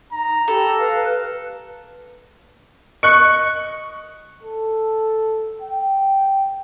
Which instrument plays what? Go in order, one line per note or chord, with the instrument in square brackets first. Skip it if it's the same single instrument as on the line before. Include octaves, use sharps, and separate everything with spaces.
[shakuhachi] D#4 [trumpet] A#5
[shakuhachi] G4 [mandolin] A4
[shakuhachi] B4 [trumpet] F5
[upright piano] D#5 F#6 [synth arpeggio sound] C#6
[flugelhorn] A4
G5